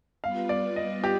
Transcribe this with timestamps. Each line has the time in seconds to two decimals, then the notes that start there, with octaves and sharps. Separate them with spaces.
0.23 G3 B3 F4 B4 F5
0.49 D5
0.76 D#5
1.04 G4